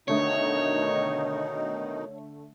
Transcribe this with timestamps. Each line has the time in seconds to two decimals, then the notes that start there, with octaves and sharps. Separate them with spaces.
0.08 B2 D3 D#3 A3 D#4 C#5